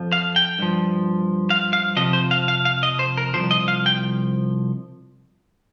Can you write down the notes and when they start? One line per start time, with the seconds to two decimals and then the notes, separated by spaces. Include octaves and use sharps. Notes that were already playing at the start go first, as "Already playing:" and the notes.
Already playing: F2 F3
0.12 F5
0.36 G5
0.59 G2 F3
1.50 F5
1.73 F5
1.97 F2 C3 F3 D#5
2.13 C5
2.31 F5
2.48 F5
2.65 F5
2.83 D#5
2.99 C5
3.17 A#4
3.34 C3 F3 C5
3.38 C2
3.51 D#5
3.68 F5
3.86 G5